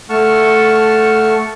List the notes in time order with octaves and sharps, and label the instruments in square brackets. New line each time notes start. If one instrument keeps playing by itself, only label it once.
[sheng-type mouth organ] A3 F#5 A5 C#6 F6